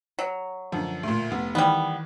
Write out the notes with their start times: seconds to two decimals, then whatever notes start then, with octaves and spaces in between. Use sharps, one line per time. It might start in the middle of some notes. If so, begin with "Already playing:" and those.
0.19 F#3
0.72 F#2 D3 F3
1.03 D2 A#2
1.31 F1 B3
1.55 D#3 E3 G3 B3